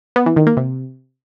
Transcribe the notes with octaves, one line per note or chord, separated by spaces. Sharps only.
B3
E3
D#3
A#3
C3